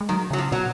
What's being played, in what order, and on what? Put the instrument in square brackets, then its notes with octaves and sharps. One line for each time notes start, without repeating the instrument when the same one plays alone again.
[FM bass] G#3
[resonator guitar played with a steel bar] D#3 [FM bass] F#3
[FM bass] C#3 [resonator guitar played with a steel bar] F#3
[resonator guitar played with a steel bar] F3
[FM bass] B2 [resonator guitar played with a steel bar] F#3